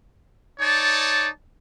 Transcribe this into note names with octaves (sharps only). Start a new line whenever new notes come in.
D#4 C#5 D5 A5